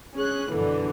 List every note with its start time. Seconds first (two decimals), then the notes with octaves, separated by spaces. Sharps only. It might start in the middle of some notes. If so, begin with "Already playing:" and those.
0.15 C#4 G#4 F#6
0.53 F#2 B2 D3 E3